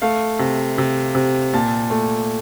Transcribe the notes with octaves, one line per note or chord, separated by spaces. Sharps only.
A3 F5
C3
C3
C3
A#2 A5
A3